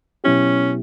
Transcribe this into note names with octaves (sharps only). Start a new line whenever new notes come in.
B2 F#3 B3 C#4 E4 G4